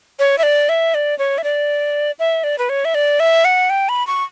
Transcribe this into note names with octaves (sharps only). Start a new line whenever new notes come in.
C#5
E5
D5
E5
D5
C#5
E5
D5
E5
D5
B4
C#5
E5
D5
E5
F#5
G5
B5
C#6